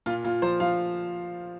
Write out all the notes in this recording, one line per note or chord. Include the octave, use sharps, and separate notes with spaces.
A#2 F4
A#2 F4
F3 C5
F3 F5